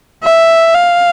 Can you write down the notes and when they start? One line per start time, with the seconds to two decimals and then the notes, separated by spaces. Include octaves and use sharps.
0.23 E5
0.74 F5